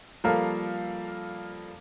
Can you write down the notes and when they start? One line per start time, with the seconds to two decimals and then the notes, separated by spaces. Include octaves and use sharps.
0.24 F3 G3 A#3 A4 A#4 F5